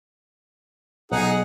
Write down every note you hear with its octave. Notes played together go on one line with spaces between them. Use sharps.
B1 D#4 G#4 F#5